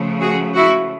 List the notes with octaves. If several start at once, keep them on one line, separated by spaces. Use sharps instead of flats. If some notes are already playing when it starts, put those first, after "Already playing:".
Already playing: C#3 F3 A3
F#4 G#4
E4 F#4